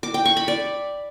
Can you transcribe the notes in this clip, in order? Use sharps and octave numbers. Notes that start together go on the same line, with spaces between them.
D6
G5
C#6
B5
D5